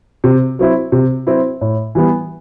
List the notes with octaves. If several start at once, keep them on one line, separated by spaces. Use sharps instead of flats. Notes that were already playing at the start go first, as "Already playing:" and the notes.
C3
F#3 C4 E4
C3
F#3 C4 E4
A2
E3 G3 B3